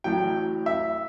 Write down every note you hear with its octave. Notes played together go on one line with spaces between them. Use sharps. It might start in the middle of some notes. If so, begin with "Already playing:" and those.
A1 A2 F#3 G5
E5